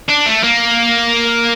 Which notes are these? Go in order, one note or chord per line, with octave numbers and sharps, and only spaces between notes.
D4
A3
A#3